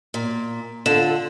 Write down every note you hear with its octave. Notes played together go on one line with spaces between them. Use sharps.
A#2
D3 F4 A4 E7